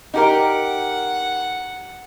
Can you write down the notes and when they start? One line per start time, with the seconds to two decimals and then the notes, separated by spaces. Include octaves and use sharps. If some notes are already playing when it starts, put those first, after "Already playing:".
0.14 D#4 G4 A#4 F#5